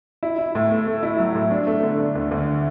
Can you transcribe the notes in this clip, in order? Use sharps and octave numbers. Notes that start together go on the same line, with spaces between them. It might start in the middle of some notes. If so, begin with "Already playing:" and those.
E4
E4
A2
A3
A3
E4
F#3
A2
D4
A3
D3
D4
D2
D2